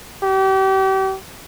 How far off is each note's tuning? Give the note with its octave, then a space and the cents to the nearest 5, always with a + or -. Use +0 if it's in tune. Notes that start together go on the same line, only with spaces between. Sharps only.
G4 -35